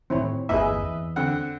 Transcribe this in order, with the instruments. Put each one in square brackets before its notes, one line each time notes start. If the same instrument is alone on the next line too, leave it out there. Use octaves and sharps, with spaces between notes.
[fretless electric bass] A2 D#3 [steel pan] C4 E4 C#5
[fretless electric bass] G1 E2 A#3 [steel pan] E4 G#4 [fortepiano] B4 D#5 E5
[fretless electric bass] E2
[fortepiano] D3 C4 F#5